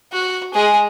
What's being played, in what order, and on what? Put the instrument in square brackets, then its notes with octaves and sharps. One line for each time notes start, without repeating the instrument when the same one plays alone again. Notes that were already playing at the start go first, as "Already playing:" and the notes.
[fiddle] F#4
G#3 G#4